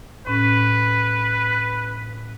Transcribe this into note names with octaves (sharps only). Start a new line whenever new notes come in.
A2 C#4 B4